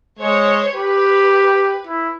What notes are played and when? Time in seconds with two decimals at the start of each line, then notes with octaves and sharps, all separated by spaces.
0.19 G#3 C5 C#5
0.75 G4 B4
1.87 E4